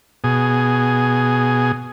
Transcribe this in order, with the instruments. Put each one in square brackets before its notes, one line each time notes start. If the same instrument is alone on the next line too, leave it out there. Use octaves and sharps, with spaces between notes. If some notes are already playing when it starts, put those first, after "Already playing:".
[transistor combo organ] B2 G#4